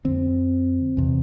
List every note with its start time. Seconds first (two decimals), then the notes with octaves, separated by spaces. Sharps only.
0.05 F2 D3 C4
0.97 E2 C3